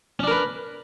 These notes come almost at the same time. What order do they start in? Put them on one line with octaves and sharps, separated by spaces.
C#4 D4 A#4 B4